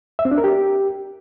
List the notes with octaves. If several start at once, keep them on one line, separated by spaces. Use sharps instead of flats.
E5
C4
D4
A#4
G4